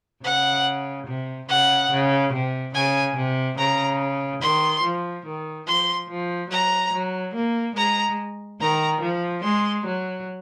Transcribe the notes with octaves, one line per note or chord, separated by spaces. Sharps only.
C#3 F#5
C3
C#3 F#5
C#3
C3
C#3 G#5
C3
C#3 A#5
D#3 C6
F3
D#3
F3 C6
F3
F#3 A#5
F#3
A#3
G#3 A#5
D#3 A#5
F3
G#3 C6
F#3